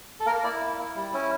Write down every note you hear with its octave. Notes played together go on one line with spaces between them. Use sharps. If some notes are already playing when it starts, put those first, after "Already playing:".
A4
A#3 A#4
E4 D5
A#3
E4
G3
C#4 E4